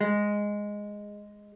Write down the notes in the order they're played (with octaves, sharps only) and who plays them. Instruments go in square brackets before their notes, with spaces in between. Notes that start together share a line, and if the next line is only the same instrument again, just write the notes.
[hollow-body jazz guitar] G#3